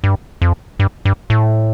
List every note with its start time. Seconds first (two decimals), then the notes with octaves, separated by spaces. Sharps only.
0.04 G2
0.42 F2
0.80 G2
1.05 G2
1.30 A2